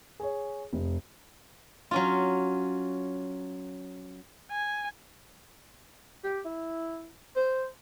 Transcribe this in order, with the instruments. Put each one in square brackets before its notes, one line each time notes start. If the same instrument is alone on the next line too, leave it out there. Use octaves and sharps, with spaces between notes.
[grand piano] G#4 C#5
F1
[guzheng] F#3 C#4 F4
[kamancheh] G#5
[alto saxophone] G4
E4
C5